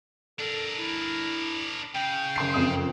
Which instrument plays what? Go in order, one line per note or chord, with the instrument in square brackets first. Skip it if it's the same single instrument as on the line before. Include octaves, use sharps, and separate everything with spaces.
[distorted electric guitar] D4 A#4 [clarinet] A4
[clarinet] E4
[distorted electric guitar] C#3 [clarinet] G5
[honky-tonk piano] F#1 C6 C7
F#1 F2 D#6